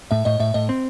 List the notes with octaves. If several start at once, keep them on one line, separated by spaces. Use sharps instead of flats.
A2 E5
A2 D#5
A2 E5
A2 D#5
C4